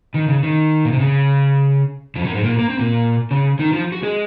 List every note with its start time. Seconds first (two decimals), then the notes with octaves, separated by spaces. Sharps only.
0.14 D#3
0.28 C#3
0.43 D#3
0.85 A#2
0.93 C3
1.00 C#3
2.15 F2 F3
2.24 F#2 F#3
2.34 G#2 G#3
2.44 A#2 A#3
2.59 A#3
2.69 C4
2.79 A#2 A#3
3.31 C#3 C#4
3.59 D#3 D#4
3.73 F3 F4
3.92 F#4
4.02 G#3 G#4